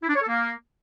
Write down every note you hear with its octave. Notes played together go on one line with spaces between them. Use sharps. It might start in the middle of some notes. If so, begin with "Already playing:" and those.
E4
D4
C#5
A4
A#3